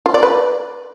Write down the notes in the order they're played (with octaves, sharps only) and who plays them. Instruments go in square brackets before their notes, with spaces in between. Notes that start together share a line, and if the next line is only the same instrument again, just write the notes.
[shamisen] F4
D5
B4